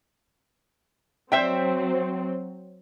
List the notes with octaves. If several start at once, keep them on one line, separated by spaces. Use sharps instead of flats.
F#3 C4 C5 E5 G5